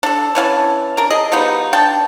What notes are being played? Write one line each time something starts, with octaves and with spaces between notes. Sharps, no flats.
D4 A4
E3 C#4 F5 A5
D4 A#4
G#4 D#5
F3 G3 B3 D#4
D4 G5 A5